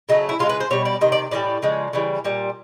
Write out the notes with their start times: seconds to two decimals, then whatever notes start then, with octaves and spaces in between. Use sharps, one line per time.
0.09 C#3 F#3 A3 D#4
0.29 E4
0.39 C#3 E3 G#3 F4
0.49 B4
0.60 C5
0.70 B2 G3 C#5
0.85 D5
1.01 C3 D#3 D#5
1.12 D5
1.31 A2 E3 G3 D5
1.62 C#3 F3 G#3
1.93 C#3 E3 G3
2.25 A#2 G3